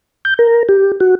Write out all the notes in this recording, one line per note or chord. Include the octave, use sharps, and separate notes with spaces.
G6
A#4
G4
F#4